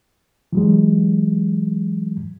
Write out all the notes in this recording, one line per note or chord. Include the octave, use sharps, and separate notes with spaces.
E3 F#3 G#3